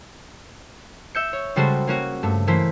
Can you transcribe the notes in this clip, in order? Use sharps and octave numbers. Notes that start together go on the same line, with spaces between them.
E5 G6 C#7
C#5
C#3 G3 G#3 F#4 A4 C5
A#3 C#4 F#4
G2 A3
E3 A3 A#3 C5 B6